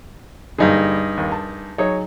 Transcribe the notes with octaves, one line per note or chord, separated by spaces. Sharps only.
G2 D3 G3 A#3 D#4 G#4
D#2
A5
F#3 D#4 G#4 C#5